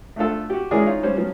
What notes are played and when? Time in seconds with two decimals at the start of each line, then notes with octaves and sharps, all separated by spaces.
0.16 A3 D4 F4 A4
0.50 F#4 G4
0.71 E3 G#3 C#4 G#4 A#4 D5
0.86 D#4 F4 C#5
1.03 G3 C#4 C5
1.17 F3 F#3 B3 C#4